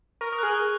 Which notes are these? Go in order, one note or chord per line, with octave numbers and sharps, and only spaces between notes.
A#4 C#6
A#4 D#6
F#6
G#4 F6
F#6